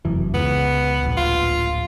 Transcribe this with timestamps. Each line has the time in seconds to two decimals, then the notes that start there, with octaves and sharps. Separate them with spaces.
0.05 F1 F#2 E3
0.34 C#2 B3
1.03 D1 A#1
1.17 F4